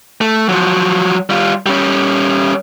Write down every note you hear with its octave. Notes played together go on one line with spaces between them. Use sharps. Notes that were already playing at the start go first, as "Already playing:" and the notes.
A3
F3 F#3
G3 F4
G3 C#4